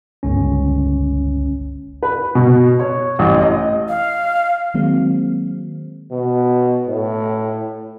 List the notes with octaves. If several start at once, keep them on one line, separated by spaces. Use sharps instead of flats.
G1 C#2 C#4
B4
B2
C#5
A1
D#5
F5
D#3 F#3 G#3 A#3 C4
B2
A2